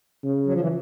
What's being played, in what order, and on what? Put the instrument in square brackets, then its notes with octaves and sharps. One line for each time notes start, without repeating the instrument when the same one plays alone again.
[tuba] C#3
[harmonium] F#3
F3
E3